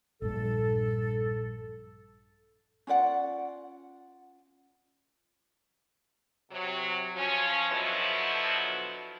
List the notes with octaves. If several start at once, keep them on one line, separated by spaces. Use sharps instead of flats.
A#1 G2 A4
C#4 F4 D5 F#5
C3 F#3
F3 C#4
B2 D3 F3 F#3 B3 E4